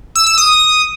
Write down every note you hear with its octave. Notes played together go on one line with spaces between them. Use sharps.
E6
E6
D#6